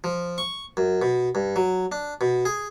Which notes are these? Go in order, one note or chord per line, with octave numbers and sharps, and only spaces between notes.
F3
C#6
F#2
B2
G2
F#3
D4
B2
G#4